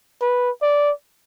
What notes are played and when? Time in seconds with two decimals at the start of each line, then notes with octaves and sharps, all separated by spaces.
0.21 B4
0.62 D5